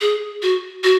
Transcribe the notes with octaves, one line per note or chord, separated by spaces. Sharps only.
G#4
F#4
F#4